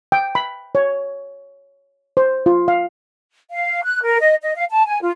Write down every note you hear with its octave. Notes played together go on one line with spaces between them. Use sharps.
G5
B5
C#5
C5
F4
F5
F5
F#6
A#4
D#5
D#5
F5
A5
G#5
F4